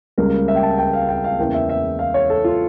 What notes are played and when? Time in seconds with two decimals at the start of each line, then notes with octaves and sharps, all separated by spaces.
0.18 C#2 C#3 G3 A#3 A#4
0.48 E5
0.56 G5
0.63 A5
0.78 G5
0.93 F5
1.09 G5
1.24 F5
1.39 E2 C#3 E3 A#3 G5
1.54 E5
1.69 E5
1.99 F5
2.14 C#5
2.30 A4
2.44 F4